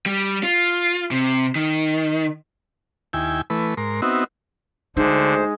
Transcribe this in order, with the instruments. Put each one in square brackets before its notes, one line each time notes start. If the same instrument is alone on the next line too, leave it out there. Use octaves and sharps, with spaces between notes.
[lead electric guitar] G3
F4
C3
D#3
[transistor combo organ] D#2 E4 G5 G#5
E3 A3 B4
G#2 A#4 C6
B3 C4 D#4 F#4 E5
[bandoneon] D2 C5 [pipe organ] D3 [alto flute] G#3 [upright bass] D#4